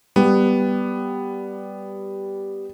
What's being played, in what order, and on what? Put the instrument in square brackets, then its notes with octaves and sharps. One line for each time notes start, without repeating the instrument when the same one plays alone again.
[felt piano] G3 [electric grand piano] B3